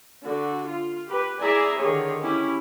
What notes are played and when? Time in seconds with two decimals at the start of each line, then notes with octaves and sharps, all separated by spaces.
0.23 D3 F#4
0.65 F4
1.07 G4 B4
1.41 E4 G#4 D5 E5 G#5 A#5
1.78 D3 D#3 G4 G#4 C#5
2.22 C#4 E4 G4